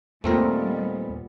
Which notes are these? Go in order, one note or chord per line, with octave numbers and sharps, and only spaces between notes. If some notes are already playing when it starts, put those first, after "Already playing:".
D#2 A#2 G3 A3 B3 C4 A#4